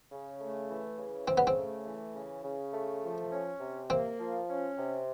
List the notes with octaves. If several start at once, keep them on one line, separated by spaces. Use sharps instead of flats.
C#3
A3
E3
C#3
C#3 C4
B3
C4
A3
E3
C#3
C#3
A3
F3
C#4
C3
A#3 C4
F3
C#4
C3